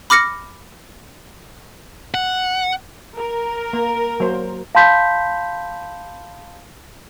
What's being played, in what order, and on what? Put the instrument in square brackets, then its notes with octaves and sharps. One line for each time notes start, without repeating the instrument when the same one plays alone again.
[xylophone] B5 D6 F6 A#6 C#7
[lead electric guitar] F#5
[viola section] A#4
[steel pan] A#3
F#3 A#3 C5
[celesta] F5 A5 B5 C6 G6 B6